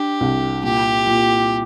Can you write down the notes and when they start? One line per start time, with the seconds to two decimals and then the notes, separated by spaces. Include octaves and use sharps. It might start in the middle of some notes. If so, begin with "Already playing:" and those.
Already playing: D4 G4
0.21 C2
0.64 A#2 G4
1.07 A#2